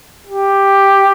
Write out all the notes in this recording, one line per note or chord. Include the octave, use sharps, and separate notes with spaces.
G4